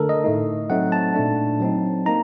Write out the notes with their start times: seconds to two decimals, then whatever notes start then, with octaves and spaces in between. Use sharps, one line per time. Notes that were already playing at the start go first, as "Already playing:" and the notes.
Already playing: D3 A3 D4 A4 A#4
0.09 D#5
0.24 A2 A3 D#4
0.70 F#3 A3 C4 D#4 F#5
0.92 A5
1.14 A#2 A3 D4
1.60 F#3 C4 D#4
2.06 A#3 D#4 A#5